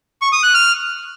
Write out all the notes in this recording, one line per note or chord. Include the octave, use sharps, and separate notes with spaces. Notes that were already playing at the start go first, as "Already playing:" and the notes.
C#6
D#6
F#6
F6